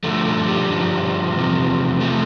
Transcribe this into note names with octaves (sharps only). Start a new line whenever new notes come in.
G2 D3 F3 A3
A3
G3
G2 D3 F3
E2 C3 F3
E2 C3 F3 A3